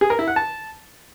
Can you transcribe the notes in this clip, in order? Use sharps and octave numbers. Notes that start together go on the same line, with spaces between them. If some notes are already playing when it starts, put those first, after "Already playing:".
G#4
A#4
E4
F#5
A5